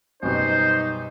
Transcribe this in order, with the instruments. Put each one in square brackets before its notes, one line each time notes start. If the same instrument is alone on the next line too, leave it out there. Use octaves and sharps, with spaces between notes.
[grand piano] F#2 B2 G3 [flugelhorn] D#4 [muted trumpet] C5